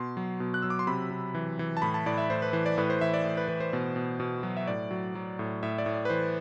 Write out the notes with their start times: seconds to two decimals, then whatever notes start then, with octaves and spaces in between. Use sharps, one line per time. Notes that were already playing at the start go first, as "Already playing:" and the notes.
Already playing: B2 C6
0.17 F#3
0.40 B2
0.54 F#6
0.62 F#3 E6
0.70 D6
0.79 C6
0.87 C3 B5
1.11 C3
1.34 E3
1.59 E3
1.77 A5
1.82 A2 B5
1.94 A5
2.06 A2 D5
2.18 E5
2.30 A2 C5
2.42 B4
2.53 E3 C5
2.66 D5
2.78 A2 B4
2.90 C5
3.01 E3 E5
3.14 D5
3.24 A2
3.37 B4
3.48 E3 B4
3.60 C5
3.73 B2
3.96 B2
4.20 B2
4.43 F#3
4.57 E5
4.67 A2 D5
4.91 F#3
5.15 F#3
5.39 A2
5.63 A2 E5
5.78 D5
5.86 A2
5.94 D5
6.05 B4
6.10 E3 C5